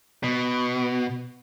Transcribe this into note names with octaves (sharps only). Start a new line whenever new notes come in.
B2